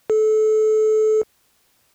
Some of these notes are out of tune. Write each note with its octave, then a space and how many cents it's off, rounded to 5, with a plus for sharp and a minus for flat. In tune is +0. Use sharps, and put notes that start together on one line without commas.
A4 -25